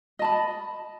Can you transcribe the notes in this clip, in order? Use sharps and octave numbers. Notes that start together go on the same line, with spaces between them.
D#5 A5 B5